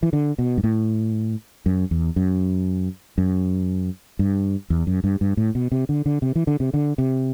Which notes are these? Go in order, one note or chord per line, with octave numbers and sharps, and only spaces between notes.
E3
D3
B2
G2
A2
F#2
E2
F#2
F#2
G2
E2
F#2
G2
G2
A2
B2
C3
D3
D3
C3
E3
D3
C3
D3
C3